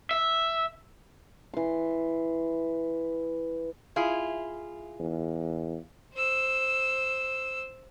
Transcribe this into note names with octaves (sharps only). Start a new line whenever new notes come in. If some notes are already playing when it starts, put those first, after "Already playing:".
E5
E3 C6
E4 F4 G#4
E2
C5 E6